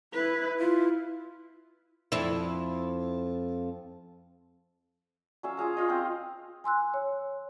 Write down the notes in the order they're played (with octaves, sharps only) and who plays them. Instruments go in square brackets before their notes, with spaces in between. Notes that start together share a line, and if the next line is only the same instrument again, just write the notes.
[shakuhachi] E4 [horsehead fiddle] B4
[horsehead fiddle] E4 [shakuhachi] F4
[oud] F2 E4
[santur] F#3 C#4 E5 F5
F4 G#4 F5 A#5
F4 D#5
C4 F5 A#5
[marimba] G#5 C6 E6 F#6
C#5